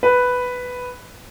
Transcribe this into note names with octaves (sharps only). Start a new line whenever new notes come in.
B4